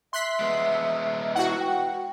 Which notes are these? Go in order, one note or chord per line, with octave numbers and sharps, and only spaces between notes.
E5 C6 F#6 B6
G#3 B3
E4 F#4 F#5
G5